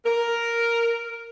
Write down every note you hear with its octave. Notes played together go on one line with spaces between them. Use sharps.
A#4